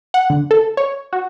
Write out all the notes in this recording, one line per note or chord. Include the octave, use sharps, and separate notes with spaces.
F#5
D3
A4
C#5
F#4